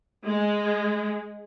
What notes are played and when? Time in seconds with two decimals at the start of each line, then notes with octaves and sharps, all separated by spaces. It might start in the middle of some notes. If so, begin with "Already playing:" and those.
0.25 G#3